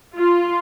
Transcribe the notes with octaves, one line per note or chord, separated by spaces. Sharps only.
F4